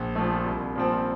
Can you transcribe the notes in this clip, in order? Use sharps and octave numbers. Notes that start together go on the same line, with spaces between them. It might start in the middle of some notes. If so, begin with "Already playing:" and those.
Already playing: A#1
A#2 F3 A3
C2
A#2 F3 C4